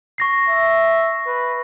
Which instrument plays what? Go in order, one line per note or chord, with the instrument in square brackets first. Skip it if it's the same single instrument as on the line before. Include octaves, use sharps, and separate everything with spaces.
[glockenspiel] C#6 A#6 C7
[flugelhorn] E5
B4